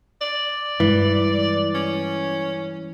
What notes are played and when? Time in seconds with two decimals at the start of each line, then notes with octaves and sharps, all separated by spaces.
0.21 D5
0.80 G2 E3 G#3
1.75 C#4